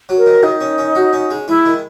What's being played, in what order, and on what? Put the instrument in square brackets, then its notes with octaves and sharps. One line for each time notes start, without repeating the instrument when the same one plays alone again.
[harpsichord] F#3
[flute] A#4
[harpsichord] D#3
[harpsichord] D#3 [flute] D#4
[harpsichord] C#4
C#4
F#4
C#4
G#3
[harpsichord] G#3 [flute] E4
[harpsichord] D#3